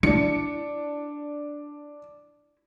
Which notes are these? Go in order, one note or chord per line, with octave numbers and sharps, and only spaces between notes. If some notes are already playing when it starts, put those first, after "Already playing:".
D4 E4 C#7